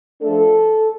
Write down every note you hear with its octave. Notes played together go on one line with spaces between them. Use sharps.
F3 A3 D4 A4